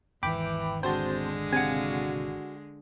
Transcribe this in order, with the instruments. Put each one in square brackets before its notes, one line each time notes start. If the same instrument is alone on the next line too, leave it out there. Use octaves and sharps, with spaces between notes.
[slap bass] G#1 E2 [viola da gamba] E3 [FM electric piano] G5 B5 D6
[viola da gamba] D3 G#3 [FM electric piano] C4 F#4 A5 [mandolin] C5
[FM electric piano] C3 [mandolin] F#4 F5 G#5